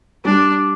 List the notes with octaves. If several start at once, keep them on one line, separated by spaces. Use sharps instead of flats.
G3 D4